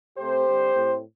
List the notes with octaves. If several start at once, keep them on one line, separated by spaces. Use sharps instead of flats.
C3 A3 C4 G4 C5
D3 G3 C4
A2 A3 C4